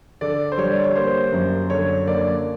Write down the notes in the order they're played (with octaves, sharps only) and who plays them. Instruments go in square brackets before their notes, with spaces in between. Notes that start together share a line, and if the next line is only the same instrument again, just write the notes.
[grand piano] D3 D5
C5
G3 C#5
D5
C#5
A#3 C5
F#2
D3 C#5
A#3 D5